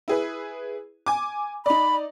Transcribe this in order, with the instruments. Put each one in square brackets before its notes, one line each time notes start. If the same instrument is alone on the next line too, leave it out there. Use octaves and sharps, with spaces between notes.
[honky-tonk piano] E4 G#4 B4
G#5 D6
[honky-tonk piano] D#4 D5 [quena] B5